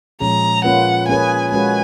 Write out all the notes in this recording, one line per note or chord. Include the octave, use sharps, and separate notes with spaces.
A#2 F3 G#3 C#4 G#4 A#5
A#3 C#4 F4 B4 F#5
A#3 C#4 G#4 B4 G#5
G#3 C#4 F#4 B4 G#5